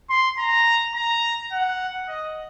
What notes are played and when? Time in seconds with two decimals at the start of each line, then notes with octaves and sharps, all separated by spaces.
0.10 C6
0.38 A#5
0.95 A#5
1.52 F#5
2.08 D#5